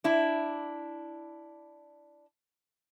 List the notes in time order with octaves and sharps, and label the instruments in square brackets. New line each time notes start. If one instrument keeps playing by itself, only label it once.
[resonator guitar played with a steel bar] D4 E4